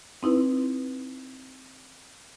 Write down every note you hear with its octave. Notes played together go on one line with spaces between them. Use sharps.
C4 D#4 E4 B4